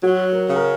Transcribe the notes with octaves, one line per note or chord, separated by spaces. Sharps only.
F#3 F#4
A#4
C#3
A#4